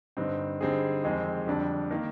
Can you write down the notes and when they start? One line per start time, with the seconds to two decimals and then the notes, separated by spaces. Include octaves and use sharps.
0.17 G2 D3 G3 C4 D#4
0.61 D3 G3 C4 D#4 G#4
1.04 F2 D#3 G#3 C4 G4
1.47 F2 D3 G3 D4
1.91 D#3 A#3